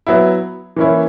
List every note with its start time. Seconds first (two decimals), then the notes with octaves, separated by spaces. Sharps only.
0.07 F#3 B3 E4
0.76 E3 A#3 C#4 E4